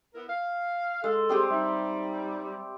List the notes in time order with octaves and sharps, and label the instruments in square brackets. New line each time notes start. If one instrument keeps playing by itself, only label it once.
[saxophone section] B3 E4 A#4
F5
[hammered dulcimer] G#3 [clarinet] A4
[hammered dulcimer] G3 C4 G4 [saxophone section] G#4
[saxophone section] G3 [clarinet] D#4 [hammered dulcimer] E5